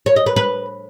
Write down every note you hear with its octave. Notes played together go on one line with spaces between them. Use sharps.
C#5
D#5
B4
B4